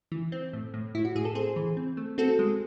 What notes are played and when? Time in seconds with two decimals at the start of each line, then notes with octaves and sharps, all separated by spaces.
0.12 E3
0.32 C4
0.53 A2
0.74 A2
0.95 A2 E4
1.05 F#4
1.15 A2 G#4
1.25 A4
1.35 C4 G#4 C5
1.56 E3
1.77 C4
1.97 A3
2.18 C4 F#4 A4
2.39 G#3